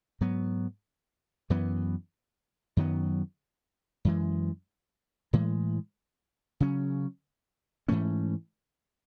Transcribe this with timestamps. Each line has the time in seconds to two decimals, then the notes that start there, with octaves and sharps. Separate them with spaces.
0.21 G#2 F#3 B3
1.50 F#2 E3 B3
2.77 F#2 D#3 F#3 B3
4.05 F#2 E3 G#3
5.33 A2 E3 G#3
6.60 C#3 F#3 C#4
7.88 G#2 E3 A3 C#4